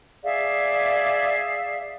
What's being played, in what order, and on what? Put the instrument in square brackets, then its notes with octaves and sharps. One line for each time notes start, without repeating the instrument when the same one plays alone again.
[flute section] G#4 D5 E5 F5